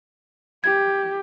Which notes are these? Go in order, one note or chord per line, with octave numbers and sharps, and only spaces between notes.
G4 G#6